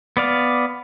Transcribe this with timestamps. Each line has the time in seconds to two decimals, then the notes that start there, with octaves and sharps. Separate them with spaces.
0.17 B3 D5 F5